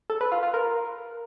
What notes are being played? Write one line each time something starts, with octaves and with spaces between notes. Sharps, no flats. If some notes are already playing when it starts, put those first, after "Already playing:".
A4
B4
F4
F4
A#4